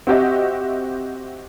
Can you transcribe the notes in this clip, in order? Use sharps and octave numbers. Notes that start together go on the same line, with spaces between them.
C4 F#4 G4 D#5 E5